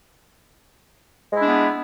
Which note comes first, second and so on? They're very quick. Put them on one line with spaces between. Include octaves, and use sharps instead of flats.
G#3 E4 D4 B3